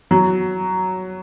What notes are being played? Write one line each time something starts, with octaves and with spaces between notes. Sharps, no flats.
F#3